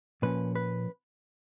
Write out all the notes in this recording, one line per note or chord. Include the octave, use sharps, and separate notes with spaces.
A#2 F3 A#3 C#4 B4
B4